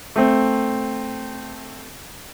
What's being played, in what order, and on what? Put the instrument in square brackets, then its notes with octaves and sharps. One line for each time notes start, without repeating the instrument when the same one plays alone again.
[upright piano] A3 C4